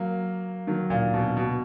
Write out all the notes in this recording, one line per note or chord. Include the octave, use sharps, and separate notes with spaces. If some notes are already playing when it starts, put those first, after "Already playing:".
Already playing: F#3 A#3
D#3 F#3
A#2
B2
B2